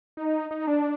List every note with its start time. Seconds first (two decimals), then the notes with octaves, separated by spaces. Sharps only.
0.17 D#4
0.51 D#4
0.67 D4